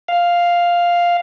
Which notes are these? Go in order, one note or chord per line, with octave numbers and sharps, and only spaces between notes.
F5